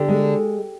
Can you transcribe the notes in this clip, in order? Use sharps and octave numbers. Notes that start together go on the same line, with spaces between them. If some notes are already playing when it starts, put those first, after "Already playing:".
Already playing: D3 G4
G#3